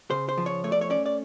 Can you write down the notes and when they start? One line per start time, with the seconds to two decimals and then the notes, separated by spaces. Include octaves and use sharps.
0.10 C#3 C5
0.29 C5
0.38 F3
0.46 C#5
0.64 A3 C#5
0.72 D5
0.81 C#5
0.90 C#4 D5
1.06 D5